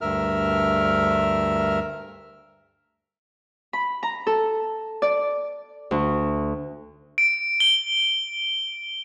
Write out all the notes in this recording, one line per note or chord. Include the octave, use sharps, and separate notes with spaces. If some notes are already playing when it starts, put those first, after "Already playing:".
D2 G2 A#4 E5 F6
B5
A#5
A4
D5
D2
D7
G7